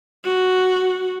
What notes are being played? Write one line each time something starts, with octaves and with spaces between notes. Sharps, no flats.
F#4